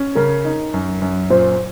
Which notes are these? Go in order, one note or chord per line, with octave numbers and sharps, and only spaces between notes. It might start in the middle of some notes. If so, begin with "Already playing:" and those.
Already playing: C#4
C#3 A#4
D#4
F#2
F#2
A#2 C5